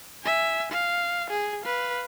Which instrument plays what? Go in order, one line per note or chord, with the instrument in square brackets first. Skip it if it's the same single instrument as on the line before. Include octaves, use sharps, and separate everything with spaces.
[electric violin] E5 G#5
F5
G#4
B4 F5